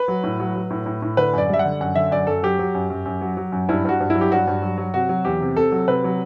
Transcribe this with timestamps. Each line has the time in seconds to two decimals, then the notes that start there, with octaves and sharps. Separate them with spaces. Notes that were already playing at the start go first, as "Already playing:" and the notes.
Already playing: B4
0.08 F#3
0.24 A2
0.40 F#3
0.56 F#3
0.70 A2
0.86 A2
1.02 A2
1.17 D3 B4
1.33 F#2 D5
1.49 G3 E5
1.59 F#5
1.65 D3
1.81 F#2 F#5
1.95 D3 E5
2.11 F#2 D5
2.27 F#2 A4
2.43 F#3 G4
2.59 F#3
2.75 F#2
2.90 F#2
3.05 F#2
3.21 F#3
3.37 F#3
3.52 F#2
3.69 G2 E4
3.85 G2 F#4
4.00 G2
4.10 E4
4.15 F#3
4.21 G4
4.32 G2 F#4
4.47 G2
4.62 F#3
4.78 F#3
4.94 C3 F#4
5.09 F#3
5.25 E2 G4
5.41 C3
5.56 C3 A4
5.72 F#3
5.88 C3 B4
6.04 F#3